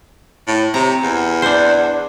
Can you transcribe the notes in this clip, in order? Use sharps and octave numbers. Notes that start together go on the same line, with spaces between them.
A2
C3 A#5
E2
D4 C5